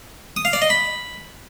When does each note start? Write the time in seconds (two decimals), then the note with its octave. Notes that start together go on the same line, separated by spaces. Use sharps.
0.36 D#6
0.45 F5
0.53 D5
0.62 D#5
0.70 B5